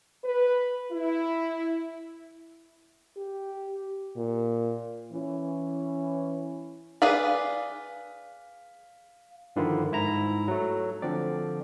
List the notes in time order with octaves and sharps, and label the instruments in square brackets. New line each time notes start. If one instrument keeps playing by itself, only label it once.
[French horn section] B4
E4
[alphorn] G4
A#2
[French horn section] E3 C#4
[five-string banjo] G#4 B4 D5 [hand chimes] F5
[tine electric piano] G2 D3 D#3 F3 E4 F4
G#2 E4 A#5
F#3 A3
D3 F3 C4 D5